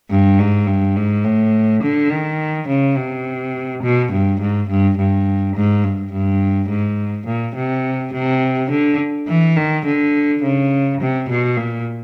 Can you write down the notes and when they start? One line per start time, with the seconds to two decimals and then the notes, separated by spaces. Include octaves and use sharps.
0.10 G2
0.39 G#2
0.67 G2
0.96 G#2
1.24 A2
1.83 D3
2.11 D#3
2.68 C#3
2.97 C3
3.83 B2
4.12 G2
4.41 G#2
4.69 G2
4.98 G2
5.55 G#2
5.84 G2
6.12 G2
6.69 G#2
7.26 A#2
7.56 C3
8.13 C3
8.71 D3
9.28 E3
9.56 D#3
9.86 D3
10.43 C#3
11.00 C3
11.29 B2
11.57 A#2